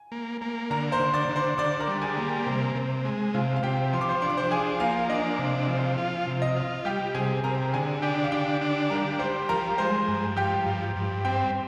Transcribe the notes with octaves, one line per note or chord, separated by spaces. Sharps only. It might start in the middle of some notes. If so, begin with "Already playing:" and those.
Already playing: G#5
A#3
A#3
D3 A#4 A#5
C5 C6
D3
D5 D6
D3
C5 C6
D3 D5 D6
A#4 A#5
G3
G#4 G#5
A#3
C3
C3
G#3
C3 F4 F5
F5
C3 G4 G5
F3 C6
D6
C5 C6
D4 C6
D6
C5 C6
F3 G#4 G#5
A#3 F4 F5
D4 D#5
C3
F3
F4
C3
D#5
F4
G3 G4 G5
C3 G#4 G#5
C3 A#4 A#5
D3 G#4 G#5
D4 G4 G5
F5
D3 G4 G5
D4
G3 A#4 A#5
G3 C5 C6
F3 A#4 A#5
G#3 C5 C6
G2
F3 G4 G5
G2
G2
C4 G4 G5